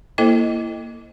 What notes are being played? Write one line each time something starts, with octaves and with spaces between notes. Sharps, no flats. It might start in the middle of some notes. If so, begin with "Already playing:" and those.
A#3 E4 A4 C5 D#5